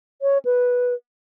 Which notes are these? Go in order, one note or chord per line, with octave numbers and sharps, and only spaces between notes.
C#5
B4